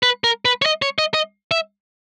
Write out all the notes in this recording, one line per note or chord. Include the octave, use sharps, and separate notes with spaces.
B4
A#4
B4
C#5
D#5
C#5
D#5
D#5
E5